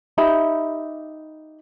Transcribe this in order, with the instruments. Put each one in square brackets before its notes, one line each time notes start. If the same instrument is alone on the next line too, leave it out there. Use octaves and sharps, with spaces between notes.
[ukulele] D#4 G4 E5 B5